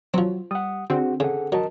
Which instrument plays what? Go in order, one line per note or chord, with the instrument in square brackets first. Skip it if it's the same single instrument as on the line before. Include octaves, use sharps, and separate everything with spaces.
[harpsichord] F3 C4 [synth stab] F#3
[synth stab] G3 [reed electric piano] F#5 D#6
[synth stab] D3 C4 [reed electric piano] F#4 G#4 F#5
[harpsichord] C#3 [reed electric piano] G#4 A4 F#5
[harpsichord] F#3 [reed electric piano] A#4 D#5 A5